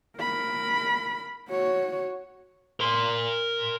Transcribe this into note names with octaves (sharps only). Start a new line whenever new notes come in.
A#4 B5
F#4 C#5
A#4 C6